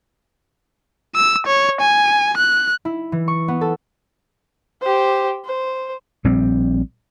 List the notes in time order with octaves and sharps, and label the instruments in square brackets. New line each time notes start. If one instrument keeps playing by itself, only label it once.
[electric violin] E6
C#5
G#5
F#6
[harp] E4
E3
C#6
B3
A4
[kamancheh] G4 C5
C5
[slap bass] A#1 G3 C4